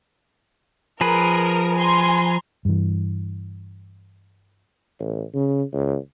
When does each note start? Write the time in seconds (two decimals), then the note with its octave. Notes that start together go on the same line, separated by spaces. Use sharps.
1.01 F3 G#4 A#4 B4
1.78 G#5 A#5 C6
2.65 G2 E3
5.00 A1
5.34 C#3
5.73 C#2